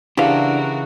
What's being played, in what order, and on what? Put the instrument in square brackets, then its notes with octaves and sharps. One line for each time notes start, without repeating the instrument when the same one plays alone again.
[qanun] C#3 E3 [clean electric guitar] D4 [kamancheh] F#4 A#4 [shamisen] G4 F5